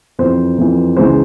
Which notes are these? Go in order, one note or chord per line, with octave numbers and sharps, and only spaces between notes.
F2 E3 C5
F2 E3
C#2 C#3 E3 C5